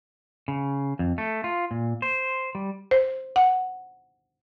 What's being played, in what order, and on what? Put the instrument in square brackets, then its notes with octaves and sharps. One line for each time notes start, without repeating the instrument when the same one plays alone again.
[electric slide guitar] C#3
F2
A3
F4
A#2
C5
G3
[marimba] C5
F#5